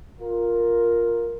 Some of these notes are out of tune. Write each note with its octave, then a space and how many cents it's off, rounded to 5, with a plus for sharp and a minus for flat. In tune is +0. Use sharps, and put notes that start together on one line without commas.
F4 +5 A#4 +0